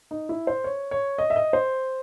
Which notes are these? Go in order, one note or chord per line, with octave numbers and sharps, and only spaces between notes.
D#4
E4
C5
C#5
C#5
D#5
E5
D#5
C5